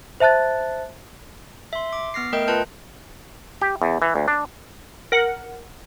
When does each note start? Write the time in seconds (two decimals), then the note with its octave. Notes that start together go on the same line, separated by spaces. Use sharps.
0.20 C5 E5 A5 F#6 A6
1.73 E5 C6
1.93 D6
2.14 B3 F6 A#6 C7
2.33 A3 A#4 D#5 G5 G6 D7
2.48 F4 A#4 B4 A5 G6
3.61 G4
3.82 E2
4.02 E3
4.16 D2
4.28 D4
5.12 A#4 F#5